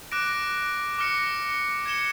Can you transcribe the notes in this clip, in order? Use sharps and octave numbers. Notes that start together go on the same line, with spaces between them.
D6 F#6 A#6 D7
D6 F6 A#6 C#7
G#6 C#7 E7 G7